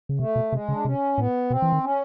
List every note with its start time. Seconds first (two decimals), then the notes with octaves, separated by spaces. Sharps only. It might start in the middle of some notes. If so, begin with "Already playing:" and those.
0.09 C#3
0.19 C3 A3
0.36 B2
0.52 C3 G#3
0.69 C#3
0.73 D4
0.85 C3 C#4
1.17 A2 B3
1.50 B2 C4
1.62 E3
1.72 D#3
1.84 C#4